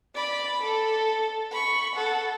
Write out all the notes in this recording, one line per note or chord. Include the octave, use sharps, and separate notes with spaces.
D5 B5
A4
B5 C#6
A4 F#5